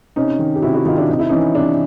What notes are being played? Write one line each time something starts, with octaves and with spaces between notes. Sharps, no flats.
C3 C#4 D#4
D#3
G4
C3 E4 F#4
E4 F#4
D#3 D#4 F4
D4 E4
C3 D#4
E4
E3 C#4 D#4
C3 D4